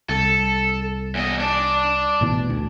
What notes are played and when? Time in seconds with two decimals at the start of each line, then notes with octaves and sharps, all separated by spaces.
0.09 C2 A4
1.15 E2 D#5
1.40 D4 D5
2.21 A1 B2 E3
2.50 D2